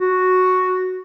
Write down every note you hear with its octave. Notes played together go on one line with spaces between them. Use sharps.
F#4